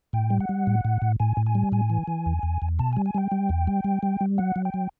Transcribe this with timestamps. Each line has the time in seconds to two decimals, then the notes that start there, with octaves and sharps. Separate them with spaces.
0.13 A2 G5
0.30 G3
0.40 F#5
0.49 G3
0.67 A2
0.85 A2
1.02 A2
1.20 A2 G#5
1.37 A2
1.46 G#5
1.55 G3
1.72 A2 G#5
1.90 E3
2.08 E3
2.26 E2
2.43 E2
2.62 E2
2.79 B2 A5
2.93 G3 G#5
3.06 G#5
3.15 G3 G5
3.32 G3
3.49 E2
3.67 G3
3.84 G3
4.03 G3
4.21 G3
4.38 F#3 F#5
4.56 F#3
4.65 G5
4.74 F#3